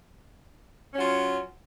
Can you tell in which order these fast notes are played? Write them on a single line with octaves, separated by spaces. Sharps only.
C#4 F#3 F4